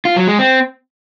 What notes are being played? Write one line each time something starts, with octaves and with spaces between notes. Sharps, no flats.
F4
F#3
G#3
C4